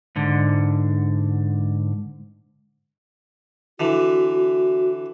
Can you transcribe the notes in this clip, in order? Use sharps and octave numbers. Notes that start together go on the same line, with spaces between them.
G#2 D3
D3 E3 F#4